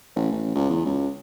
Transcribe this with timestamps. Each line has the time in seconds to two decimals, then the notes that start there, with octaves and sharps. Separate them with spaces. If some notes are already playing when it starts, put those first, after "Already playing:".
0.16 A1
0.32 A1
0.55 C#2
0.70 E2
0.85 C#2